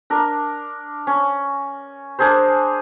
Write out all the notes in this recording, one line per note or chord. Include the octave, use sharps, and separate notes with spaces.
D4 A#4
C#4
D4 G#4 A#4 C5